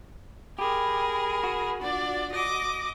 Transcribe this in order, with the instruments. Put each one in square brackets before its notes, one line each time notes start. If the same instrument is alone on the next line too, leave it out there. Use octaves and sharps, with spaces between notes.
[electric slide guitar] G4 [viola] G#4 A#4 [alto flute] B5
[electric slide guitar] F#4
[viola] D4 D5 [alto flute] F4
[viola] D#5 D6